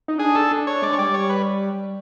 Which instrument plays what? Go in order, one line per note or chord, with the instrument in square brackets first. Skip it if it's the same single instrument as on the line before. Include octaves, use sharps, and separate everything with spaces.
[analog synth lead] D#4
[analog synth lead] D4 [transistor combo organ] G#4
[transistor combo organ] A4
[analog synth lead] D4
[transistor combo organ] C#5
[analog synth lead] G#3 [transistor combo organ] D5
[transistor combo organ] C#5
[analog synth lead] G3 [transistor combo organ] D5
[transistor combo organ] C#5
B4